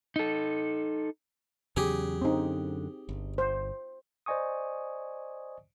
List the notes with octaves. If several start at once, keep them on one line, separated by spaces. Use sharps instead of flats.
D#4 A4
E2 C#3 F#3 G4 G#4
F#2 D3 C4 D#4
G1
C5
C5 D5 D#5 G#5 C#6 D#6